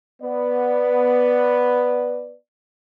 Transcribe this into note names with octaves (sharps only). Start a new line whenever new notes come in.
B3 B4 D5